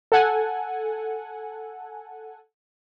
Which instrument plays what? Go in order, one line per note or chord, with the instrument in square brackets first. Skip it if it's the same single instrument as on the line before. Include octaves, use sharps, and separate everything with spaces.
[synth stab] A4 F#5 G#5